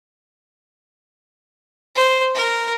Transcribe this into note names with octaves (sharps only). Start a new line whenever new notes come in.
C5
A#4